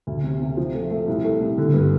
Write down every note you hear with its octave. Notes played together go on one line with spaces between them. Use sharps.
D2
C3
C3
F3
A3
A3
C2
A3
C2
D3
G2